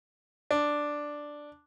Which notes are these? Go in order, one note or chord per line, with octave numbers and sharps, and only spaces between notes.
D4